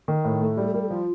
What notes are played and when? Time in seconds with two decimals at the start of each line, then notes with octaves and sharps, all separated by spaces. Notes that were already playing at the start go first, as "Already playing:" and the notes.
0.08 D#3
0.25 A2
0.41 A3
0.57 G3 G4
0.66 A4
0.74 G3 A#4
0.82 A4
0.90 F3 F4